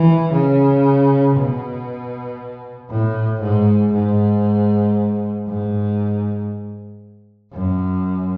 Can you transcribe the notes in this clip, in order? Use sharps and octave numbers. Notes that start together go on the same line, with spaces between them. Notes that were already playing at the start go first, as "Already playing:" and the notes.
Already playing: E3
C#3
B2
A2
G#2
G#2
G#2
F#2